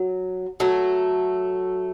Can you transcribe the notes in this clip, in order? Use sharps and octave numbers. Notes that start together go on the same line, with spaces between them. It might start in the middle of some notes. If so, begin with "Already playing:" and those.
Already playing: F#3
F#3 A3